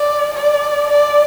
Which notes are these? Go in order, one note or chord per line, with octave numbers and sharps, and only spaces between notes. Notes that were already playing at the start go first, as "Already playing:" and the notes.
Already playing: D5
D5
D5